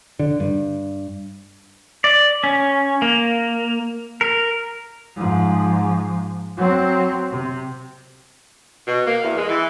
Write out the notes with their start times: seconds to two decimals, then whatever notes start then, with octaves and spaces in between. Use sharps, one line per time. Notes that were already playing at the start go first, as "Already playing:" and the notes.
0.19 D3
0.40 G2
2.04 D5
2.44 C#4
3.02 A#3
4.21 A#4
5.16 G#2 F3
6.57 F#3 C4
7.31 C3
8.87 B2
9.07 A#3
9.23 E2
9.38 G#3
9.49 E3